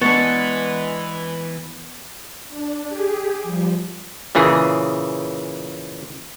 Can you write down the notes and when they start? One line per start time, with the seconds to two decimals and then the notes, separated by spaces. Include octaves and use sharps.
0.02 E3 G#3 B3 D4 C#6 A6 C#7
2.48 D4
2.88 G4 G#4
3.43 F3 G3
4.35 A#2 C#3 E3 G#4